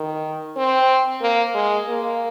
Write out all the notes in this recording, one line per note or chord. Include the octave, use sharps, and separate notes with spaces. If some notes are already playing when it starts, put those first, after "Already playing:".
Already playing: D#3
C4
A#3
G#3
A#3